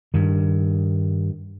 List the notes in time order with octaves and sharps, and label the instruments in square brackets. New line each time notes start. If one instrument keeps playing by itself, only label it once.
[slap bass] G2 D#3